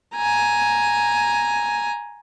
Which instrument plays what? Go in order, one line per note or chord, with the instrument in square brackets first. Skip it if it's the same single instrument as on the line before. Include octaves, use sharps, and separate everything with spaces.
[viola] G#5 A#5